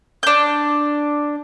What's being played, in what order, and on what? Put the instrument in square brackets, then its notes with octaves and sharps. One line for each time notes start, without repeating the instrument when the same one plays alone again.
[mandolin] D4 G6